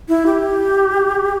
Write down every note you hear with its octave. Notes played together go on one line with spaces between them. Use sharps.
E4
G4